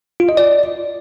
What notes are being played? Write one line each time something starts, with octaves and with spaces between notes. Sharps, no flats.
F4
D#5
D5